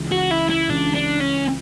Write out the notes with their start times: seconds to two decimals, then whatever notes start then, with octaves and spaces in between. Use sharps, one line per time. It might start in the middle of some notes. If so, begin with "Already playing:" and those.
Already playing: C#2 C#3 E3
0.11 F#4
0.31 E4
0.50 E4
0.69 C#2 C#3 E3 D4
0.95 D4
1.21 C#4